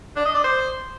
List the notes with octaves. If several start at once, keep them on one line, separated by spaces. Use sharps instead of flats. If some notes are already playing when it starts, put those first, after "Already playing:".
D4
D#5
D5
C5